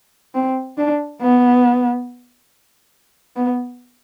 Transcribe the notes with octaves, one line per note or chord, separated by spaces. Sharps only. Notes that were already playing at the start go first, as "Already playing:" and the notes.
C4
D4
B3
B3